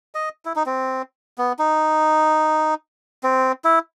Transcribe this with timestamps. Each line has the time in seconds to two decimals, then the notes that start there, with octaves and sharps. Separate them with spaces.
0.15 D#5
0.45 E4
0.56 D#4
0.66 C4
1.38 B3
1.59 D#4
3.23 C4
3.65 E4